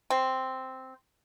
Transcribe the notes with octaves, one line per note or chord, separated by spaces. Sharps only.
C4